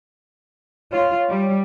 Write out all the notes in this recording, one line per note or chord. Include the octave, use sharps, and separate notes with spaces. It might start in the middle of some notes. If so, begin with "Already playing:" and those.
F4 C#5
G3